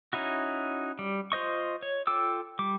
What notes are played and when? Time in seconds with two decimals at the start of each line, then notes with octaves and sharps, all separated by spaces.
0.13 C#4 D#4 E4 F#4
0.99 G3
1.32 F4 C5 D#5 C#6
1.82 C#5
2.07 F4 A4 G5 D6 E6
2.59 G3 D6